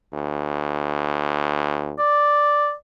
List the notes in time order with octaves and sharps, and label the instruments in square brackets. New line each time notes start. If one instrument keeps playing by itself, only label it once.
[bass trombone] D2
[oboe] D5